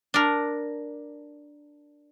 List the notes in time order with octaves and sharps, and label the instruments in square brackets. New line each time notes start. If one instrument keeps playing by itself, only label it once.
[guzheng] D4 A#4